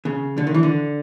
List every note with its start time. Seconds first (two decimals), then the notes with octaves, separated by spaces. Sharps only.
0.05 C#3
0.38 D3
0.47 D#3
0.54 E3
0.63 D3